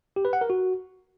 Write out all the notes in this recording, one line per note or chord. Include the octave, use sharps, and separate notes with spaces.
G4
B4
F#5
A#4
F#4